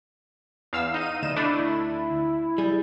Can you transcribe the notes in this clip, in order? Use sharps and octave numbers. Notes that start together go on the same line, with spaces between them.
E2 F5 E6
D#4 D#7
D2 D#5 D#7 E7
A3 D4 E4
G3 G#4